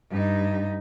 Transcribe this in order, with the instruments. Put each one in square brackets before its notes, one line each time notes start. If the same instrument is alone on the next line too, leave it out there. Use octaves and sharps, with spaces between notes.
[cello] G2 D#4